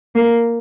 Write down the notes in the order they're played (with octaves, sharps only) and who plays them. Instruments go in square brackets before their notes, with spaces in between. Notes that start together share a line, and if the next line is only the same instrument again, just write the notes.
[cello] A#3